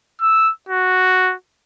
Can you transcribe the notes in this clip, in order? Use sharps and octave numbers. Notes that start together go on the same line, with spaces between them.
E6
F#4